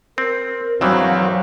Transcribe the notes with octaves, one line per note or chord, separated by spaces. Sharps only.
C4 A#4
E2 G2 D#3 E3 F#3 C4 F5